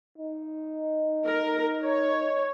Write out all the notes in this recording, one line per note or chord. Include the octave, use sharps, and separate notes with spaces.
D#4
A#4
C#5